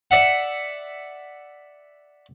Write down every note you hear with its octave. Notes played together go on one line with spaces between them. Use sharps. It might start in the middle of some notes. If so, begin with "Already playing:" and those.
D5 E5 F#5